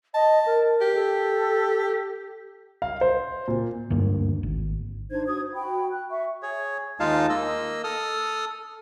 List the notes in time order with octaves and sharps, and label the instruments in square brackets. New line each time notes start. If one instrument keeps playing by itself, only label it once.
[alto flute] D#5 [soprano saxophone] A5
[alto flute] A#4
[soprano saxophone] G4
[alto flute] A4
[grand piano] F5
C5
A#2
[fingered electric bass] D2 G2 A#3
G#1
[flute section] D4 D#4 C5 G#6
F#4 D#6 G#6
C5
F#4 G5 B5
F#6
E5 C#6
[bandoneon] G#4 C#5
D#2 G#3 D#4 F4 F5 A5
A#3 D#5 E6
A4 D#6 F6